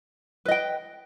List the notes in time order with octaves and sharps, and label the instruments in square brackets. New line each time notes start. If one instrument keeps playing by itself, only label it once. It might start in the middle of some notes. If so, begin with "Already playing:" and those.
[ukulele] B4
D#5
G5